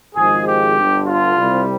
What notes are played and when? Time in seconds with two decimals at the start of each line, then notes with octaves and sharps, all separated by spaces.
0.15 G#1 G#2 F3 G#3 G#4
0.46 G4
0.76 G1 G2 D3
1.07 F4
1.37 C2 C3 G3